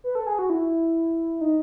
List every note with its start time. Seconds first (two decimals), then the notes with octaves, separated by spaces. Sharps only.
0.04 B4
0.15 A4
0.27 G#4
0.39 F#4
0.50 E4
1.41 D#4